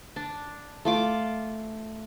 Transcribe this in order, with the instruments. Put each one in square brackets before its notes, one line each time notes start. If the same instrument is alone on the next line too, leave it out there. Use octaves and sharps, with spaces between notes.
[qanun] D4
A3 F4 D6